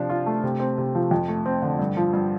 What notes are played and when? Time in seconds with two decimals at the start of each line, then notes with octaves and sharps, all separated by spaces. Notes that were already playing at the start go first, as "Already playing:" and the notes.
Already playing: C3 F3 D4
0.10 F4
0.26 A3
0.43 C3
0.60 C4
0.78 C3
0.95 F3
1.11 F2
1.28 A3
1.46 C4
1.62 D3
1.79 G2
1.97 F3
2.13 G2